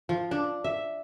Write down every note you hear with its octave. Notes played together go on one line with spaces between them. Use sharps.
F3
D4
E5